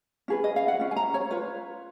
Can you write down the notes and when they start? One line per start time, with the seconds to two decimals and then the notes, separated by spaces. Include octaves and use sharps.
0.28 C#4 F4 G#4 B4
0.44 D#5
0.56 F5
0.68 F#5
0.80 C#4 F4
0.91 G#5
0.96 A#5
1.14 C#5
1.31 F4 B4 C#5